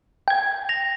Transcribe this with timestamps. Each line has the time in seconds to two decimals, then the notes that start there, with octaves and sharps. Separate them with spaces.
0.28 G5 G#6
0.69 A#6 F7